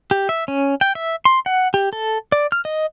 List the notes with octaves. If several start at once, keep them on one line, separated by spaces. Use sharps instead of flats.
G4
E5
C#4
G5
E5
C6
F#5
G4
A4
D5
F6
D#5